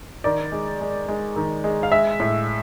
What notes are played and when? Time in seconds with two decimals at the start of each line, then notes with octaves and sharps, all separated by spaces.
0.24 D#3 D5
0.52 G#3
0.81 G#3
1.08 G#3
1.36 D#3
1.64 G#3
1.83 F5
1.92 G#3 E5
2.20 A2